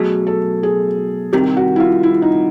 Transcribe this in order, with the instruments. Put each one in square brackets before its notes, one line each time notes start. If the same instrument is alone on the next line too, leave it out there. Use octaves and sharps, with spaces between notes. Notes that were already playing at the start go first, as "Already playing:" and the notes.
Already playing: [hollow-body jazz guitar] B2 F#3 A3 [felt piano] G#4
[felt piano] A4
G#4
[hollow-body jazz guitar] C2 C3 D#3 [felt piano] G4
[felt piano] F#4
E4
F4
E4
D#4